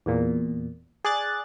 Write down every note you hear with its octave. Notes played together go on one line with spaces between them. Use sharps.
E2 A#2
G#4 D5 F#6 A6